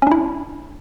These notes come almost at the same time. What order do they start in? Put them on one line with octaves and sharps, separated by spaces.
C#4 D4 E4